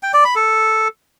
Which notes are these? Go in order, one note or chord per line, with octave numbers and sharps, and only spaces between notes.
G5
D5
B5
A4